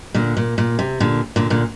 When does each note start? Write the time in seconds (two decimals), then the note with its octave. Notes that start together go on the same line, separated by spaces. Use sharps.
0.15 A#2 D3
0.37 A#2
0.58 A#2
0.79 C3
1.00 A#2 D3
1.36 A#2 D3
1.50 A#2 D3